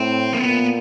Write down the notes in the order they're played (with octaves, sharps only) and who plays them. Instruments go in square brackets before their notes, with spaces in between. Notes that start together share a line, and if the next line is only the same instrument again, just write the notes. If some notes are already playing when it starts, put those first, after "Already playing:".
Already playing: [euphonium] A2 [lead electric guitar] C4
[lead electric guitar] A#3
[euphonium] A#2 [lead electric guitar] B3